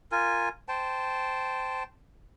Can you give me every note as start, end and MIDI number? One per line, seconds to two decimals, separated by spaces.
0.12 0.49 65
0.12 0.49 70
0.12 0.49 80
0.68 1.83 72
0.68 1.83 79
0.68 1.83 81